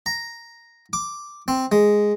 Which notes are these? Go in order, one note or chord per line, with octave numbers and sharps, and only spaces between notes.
A#5
D6
C4
G#3